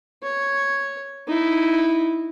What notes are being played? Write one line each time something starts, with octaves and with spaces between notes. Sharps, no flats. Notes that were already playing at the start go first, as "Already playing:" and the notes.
C#5
D#4 E4